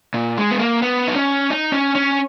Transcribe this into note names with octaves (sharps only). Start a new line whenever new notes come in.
A#2
G#3
B3
A#3
B3
D#4
C#4
D#4
C#4
C#4